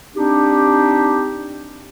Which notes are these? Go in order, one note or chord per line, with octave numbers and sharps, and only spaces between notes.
C4 D4 D#4 G4